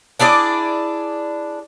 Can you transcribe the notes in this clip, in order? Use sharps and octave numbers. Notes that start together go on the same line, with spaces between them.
D4 E4 G#4 D5